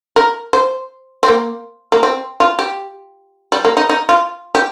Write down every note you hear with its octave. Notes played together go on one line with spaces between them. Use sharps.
A#4
C5
C4
A#3
A#3
C4
F4
G4
G3
A#3
D#4
D#4
F4
G4